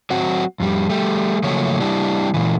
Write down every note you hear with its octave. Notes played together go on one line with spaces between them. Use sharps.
F#3 C4 F#4
F2 G3
G3 A3
C#3 F3 F#3 A3 A#3 C#5
G3 D4 E4 G4
A#2 E3